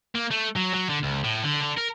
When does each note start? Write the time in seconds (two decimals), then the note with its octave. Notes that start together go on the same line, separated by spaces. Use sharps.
0.15 A#3
0.31 A3
0.56 F#3
0.74 F#3
0.90 D3
1.03 C#2
1.24 A2
1.43 D3
1.62 D3
1.77 A#4